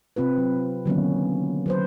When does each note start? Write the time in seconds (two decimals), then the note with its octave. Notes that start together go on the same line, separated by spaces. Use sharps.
0.16 C3 C4 F4 B4
0.38 F#3
0.86 D3 D#3 F#3 A#3 B3 C#4
1.66 F#3 B4 C5